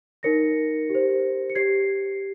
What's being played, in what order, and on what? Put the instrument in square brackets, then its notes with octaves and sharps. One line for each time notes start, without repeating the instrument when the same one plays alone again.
[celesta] D#4 A#4 C#5 A#6 C#7
G4 C5
C#7
G4 C#5 G#6 C7